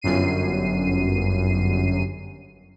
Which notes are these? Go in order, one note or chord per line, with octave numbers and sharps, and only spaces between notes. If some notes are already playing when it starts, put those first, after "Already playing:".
G1 F#2 C7 D#7